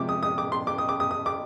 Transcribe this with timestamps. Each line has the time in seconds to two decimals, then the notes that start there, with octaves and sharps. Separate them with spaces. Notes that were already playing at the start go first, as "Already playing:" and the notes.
Already playing: C3 F3 G#3 D6
0.09 D#6
0.23 D#6
0.38 D6
0.52 C6
0.67 D6
0.78 D#6
0.89 D6
1.00 D#6
1.11 D#6
1.26 D6